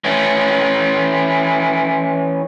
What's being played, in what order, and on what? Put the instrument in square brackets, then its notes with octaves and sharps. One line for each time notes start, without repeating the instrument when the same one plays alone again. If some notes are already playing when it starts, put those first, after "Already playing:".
[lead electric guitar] E3 C#4